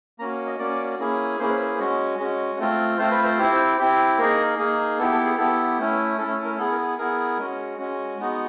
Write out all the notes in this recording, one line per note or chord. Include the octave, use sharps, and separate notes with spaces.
A#3 C#4 F#4 A#5
D#5
A#3 C#4 F#4 D5
A#3 C#4 E4 G#4
A#3 C#4 E4 G#4 C5
B4
C5
G#3 C#4 F#4
G#3 C#4 F#4
A3 C4 F4
A3 C4 F4 C5
B4
C5
C4 E4 G4
C4 E4 G4
A#3 D#4 G#4 A#4
A#3 D#4 G#4
B3 E4 G4 A4
A4
G#4
B3 E4 G4 A4
A3 C#4 E4
A3 C#4 E4 A4
A4
A#4
B3 E4 G#4 A4
A#4
B3 E4 G#4 A#4
G#3 C#4 F#4
G#3 C#4 F#4
G#3 B3 D#4 F#4